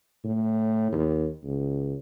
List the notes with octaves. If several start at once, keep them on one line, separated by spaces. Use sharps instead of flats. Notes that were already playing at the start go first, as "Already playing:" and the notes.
A2
D#2
C#2